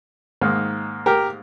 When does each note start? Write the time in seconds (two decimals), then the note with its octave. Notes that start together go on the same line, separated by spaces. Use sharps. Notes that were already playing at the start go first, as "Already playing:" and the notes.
0.41 G#2 D#3 A#3
1.06 G4 A#4